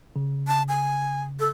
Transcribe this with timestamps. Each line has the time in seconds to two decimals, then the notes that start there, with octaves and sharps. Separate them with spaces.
0.16 C#3
0.48 A5
0.68 G#5
1.40 A4